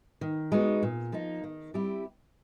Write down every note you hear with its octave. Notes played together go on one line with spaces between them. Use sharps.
D#3
G#3 B3 D#4 F#4
A#2
F3 A#3 D#4
D#3
G3 C4 E4 G4